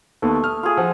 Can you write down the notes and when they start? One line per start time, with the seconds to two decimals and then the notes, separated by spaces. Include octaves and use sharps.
0.22 D#2 A3 B3
0.44 D#6 F6
0.63 F4 G#4
0.77 F3 F#5